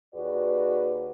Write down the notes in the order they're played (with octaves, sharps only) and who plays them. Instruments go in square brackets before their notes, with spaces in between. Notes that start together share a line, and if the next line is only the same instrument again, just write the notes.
[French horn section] D#2 F#4 G#4 B4 D5